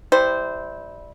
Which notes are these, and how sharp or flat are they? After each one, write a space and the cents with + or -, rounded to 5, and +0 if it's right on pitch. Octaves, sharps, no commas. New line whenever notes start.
G3 +5 E4 -20 C5 -10